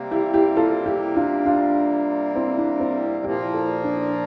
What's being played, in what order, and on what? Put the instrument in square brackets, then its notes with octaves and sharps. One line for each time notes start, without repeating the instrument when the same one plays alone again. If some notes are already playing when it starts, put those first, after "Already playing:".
Already playing: [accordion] C3 G3 A#3
[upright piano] E4 G4
E4 G4
F4 A4
E4 G4
D4 F4
D4 F4
C4 E4
D4
C4 E4
[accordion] A#2 F3 A#3 [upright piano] E4 G4
[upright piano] F4 A4
D4